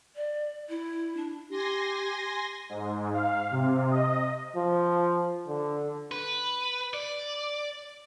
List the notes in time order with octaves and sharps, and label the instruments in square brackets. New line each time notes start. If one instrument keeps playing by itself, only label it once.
[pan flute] D5
E4
D4
[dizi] G4 [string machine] G#5 C6 A#6
[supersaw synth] G#2
F5
C3
D#5
[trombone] F3
D3
[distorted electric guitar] B4
D5